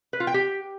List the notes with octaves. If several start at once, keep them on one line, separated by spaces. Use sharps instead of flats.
B4
F4
G5
G4